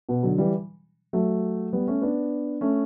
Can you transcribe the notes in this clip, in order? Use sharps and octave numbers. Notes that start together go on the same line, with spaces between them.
B2
D3 F#3
E3 G3
F#3 A3
G3 B3
A3 C#4
B3 D4
A3 C#4